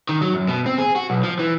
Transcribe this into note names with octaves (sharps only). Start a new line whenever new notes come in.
D#3
F#3
F#2
B2
C4
G#4
F#4
B1
F3
E3